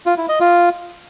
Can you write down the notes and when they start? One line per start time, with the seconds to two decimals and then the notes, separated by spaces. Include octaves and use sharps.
0.06 F4
0.17 E4
0.29 D#5
0.40 F4